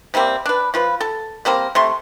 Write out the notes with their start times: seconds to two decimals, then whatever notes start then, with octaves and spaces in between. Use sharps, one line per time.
0.14 C3 G3 A#3 C4
0.46 D4 B4
0.74 F3 F4 B4
1.00 A4 A5
1.45 G3 A#3 C4 A#4
1.75 C3 A3 C6